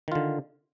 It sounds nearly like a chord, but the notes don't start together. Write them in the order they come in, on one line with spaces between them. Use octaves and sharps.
D#3 F4 D3